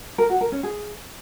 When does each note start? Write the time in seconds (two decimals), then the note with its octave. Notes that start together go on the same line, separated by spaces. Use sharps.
0.18 A#4
0.30 F#4
0.41 A#4
0.52 C#4
0.63 G#4